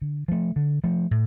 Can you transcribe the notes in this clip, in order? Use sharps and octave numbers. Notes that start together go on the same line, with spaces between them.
D3
F3 A3
D3
F3 A3
A2